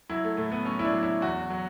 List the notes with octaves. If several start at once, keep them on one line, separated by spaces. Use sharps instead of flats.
F#3 E4
A3
A2 A3
B3
F#3 C#4
E4
D4
F#3
E4
E2 F#4
F#3